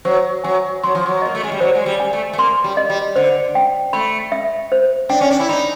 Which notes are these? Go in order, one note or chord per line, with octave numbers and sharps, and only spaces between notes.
F#3 C5
F#3 G#5
F#3 C6
F3
F#3
A#3 D#5
A3
G#3
G3
F#3 C5
G#3
G3
G#5
A3
A3
A#3 C6
G3
D#5
G3
D3 C5
G5
A3 B5
E5
C5
D4 G5
C#4
D4
E4
D#4 B5